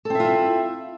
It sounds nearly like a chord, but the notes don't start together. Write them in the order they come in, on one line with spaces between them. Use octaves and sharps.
A4 C4 E5 F4 E4